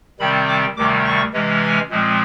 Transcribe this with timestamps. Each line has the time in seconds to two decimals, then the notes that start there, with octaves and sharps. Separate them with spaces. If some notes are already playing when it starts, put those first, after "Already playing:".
0.20 C3 D#3 G3 C4 B5
0.48 D6
0.76 D2 C3 D#3 G3 D6
1.05 C#6
1.33 C3 E3 G#3 C#4
1.62 G#5
1.90 A#2 F3 G#3 C4